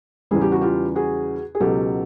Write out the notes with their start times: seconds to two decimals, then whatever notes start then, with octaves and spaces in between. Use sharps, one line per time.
0.31 E2 C#3 E3 G3 G#4
0.41 G4
0.52 F#4
0.61 F4 G4
0.95 F#4 G#4
1.55 G#4
1.60 C#2 B2 F#3 G4 A4